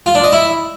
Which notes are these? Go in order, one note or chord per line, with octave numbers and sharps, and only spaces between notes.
F4
D4
D#5
E4